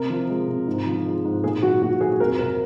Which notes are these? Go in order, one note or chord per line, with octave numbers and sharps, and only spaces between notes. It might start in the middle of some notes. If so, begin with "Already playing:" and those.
Already playing: C3 A#4
F3
G#3
C3
G#2
F3
G#3
G#2
A#2 G#4
F#3 F#4
A#2 F#4
F#3 G#4
F2 A#4
C3 A#4